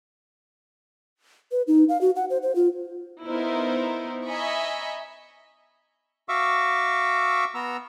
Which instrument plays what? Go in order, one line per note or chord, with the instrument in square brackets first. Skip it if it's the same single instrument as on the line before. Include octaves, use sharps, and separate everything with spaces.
[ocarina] B4
D#4
F5
F#4
F#5
C5
C5
F4
[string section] B3 D#4 E4 A#4 C5
D#5 E5 G#5 A#5 B5 C#6
[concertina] F#4 E5 F5 C#6 D6 E6
B3 A#5 E6